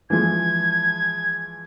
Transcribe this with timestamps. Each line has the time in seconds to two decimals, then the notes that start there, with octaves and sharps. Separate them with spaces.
0.10 E3 F3 G#3 G#6